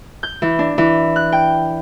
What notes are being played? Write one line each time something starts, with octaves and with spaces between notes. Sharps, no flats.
G6
E3
D4
E3
F#6
G5